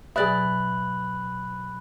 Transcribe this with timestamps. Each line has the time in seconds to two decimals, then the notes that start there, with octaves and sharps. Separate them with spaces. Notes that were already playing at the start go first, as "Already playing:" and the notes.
0.16 B2 F#3 G#4 D5 E5 B5 F#6 F#7